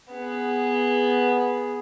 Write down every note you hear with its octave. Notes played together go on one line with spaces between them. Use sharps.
B3 G#4